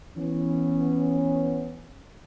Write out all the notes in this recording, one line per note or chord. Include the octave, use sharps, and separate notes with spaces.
E3 B3 C#4